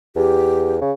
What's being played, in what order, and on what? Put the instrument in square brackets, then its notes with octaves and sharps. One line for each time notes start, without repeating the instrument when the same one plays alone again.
[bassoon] E2 [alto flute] G4
[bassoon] C#3